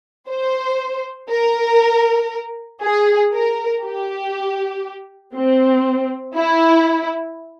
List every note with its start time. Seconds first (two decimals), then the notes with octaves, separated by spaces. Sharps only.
0.29 C5
1.30 A#4
2.82 G#4
3.32 A#4
3.83 G4
5.35 C4
6.34 E4